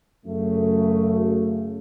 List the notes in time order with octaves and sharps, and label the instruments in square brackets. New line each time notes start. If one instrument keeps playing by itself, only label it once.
[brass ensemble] F#2 C#3 A3